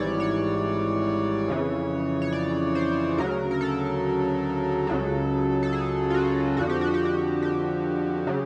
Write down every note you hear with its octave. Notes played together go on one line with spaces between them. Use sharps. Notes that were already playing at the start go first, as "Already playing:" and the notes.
Already playing: G#1 G#2 E3 G3 C#5 D5
C#5
F2 C#3 E3
C#5
D5
C5
D2 C#3 F#3 A#4
A#4
A4
C#2 C#3 F#3
A4
G#4
F4
F#4
F2 D3 F3 F#4
G4
F#4
G4
F#4
G4
C#3 F#3